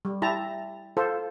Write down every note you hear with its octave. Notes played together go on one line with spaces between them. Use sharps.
G3
E4 G4 A5 A#5
F4 A4 C5